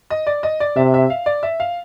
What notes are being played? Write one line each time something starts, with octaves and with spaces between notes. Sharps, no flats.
D#5
D5
D#5
D5
C3 E5
E5
F5
D5
E5
F5